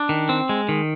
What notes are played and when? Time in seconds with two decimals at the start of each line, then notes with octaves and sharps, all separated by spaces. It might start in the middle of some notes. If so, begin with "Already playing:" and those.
Already playing: D4
0.09 D#3
0.29 C4
0.49 G#3
0.69 D#3